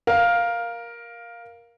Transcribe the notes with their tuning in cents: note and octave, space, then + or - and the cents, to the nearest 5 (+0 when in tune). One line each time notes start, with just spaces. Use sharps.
A#4 +10 F5 +0